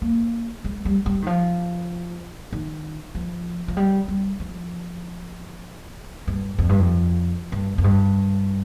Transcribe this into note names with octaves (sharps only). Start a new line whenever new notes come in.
A#3
G#3
G3
G3
D#3
F3
D#3
F3
F3
G3
G3
F3
G2
F2
G2
F2
G2
F2
G2